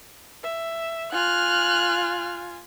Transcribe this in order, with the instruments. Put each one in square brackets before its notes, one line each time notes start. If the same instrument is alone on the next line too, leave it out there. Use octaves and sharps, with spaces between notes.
[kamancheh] E5
[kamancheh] F4 G#5 [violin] F6 F#6